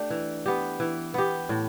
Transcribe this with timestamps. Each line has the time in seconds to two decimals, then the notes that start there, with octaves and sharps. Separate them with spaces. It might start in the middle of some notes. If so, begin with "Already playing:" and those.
Already playing: A3 D4 G4
0.10 E3
0.46 B3 G4
0.80 E3
1.14 B3 G4
1.49 A2